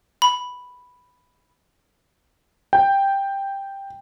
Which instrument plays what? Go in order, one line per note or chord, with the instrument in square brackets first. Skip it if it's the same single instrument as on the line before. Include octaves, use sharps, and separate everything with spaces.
[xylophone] B5
[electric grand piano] G5